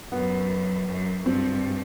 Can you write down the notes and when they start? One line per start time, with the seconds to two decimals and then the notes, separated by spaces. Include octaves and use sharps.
0.12 F#2 B3
0.88 F#2
1.26 G2 C4